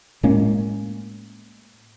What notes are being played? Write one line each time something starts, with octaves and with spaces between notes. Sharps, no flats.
A2 G#3 A#3 C#4